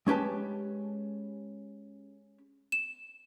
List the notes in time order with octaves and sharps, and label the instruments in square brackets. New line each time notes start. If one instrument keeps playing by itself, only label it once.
[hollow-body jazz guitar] G#3 C#4 G4 B4 A5
[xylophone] E7